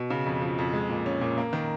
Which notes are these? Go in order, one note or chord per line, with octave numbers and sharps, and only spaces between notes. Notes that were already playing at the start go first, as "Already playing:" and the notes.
Already playing: B2
C#3
F2
F3
F2
G#3
A#2
C#4
A#2
A#3
D#3